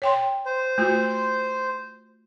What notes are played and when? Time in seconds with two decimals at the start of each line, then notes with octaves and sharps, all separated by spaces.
0.02 C#5 G5 C6
0.46 C5
0.78 A3 F4 F#4